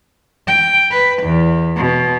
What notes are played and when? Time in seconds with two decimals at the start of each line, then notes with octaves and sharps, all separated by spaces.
0.47 G5
0.91 B4
1.23 E2
1.76 B2